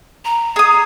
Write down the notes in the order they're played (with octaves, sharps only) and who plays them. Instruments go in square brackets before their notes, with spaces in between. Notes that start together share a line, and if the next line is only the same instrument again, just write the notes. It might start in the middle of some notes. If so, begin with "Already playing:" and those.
[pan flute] A#5
[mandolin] G#4 D#6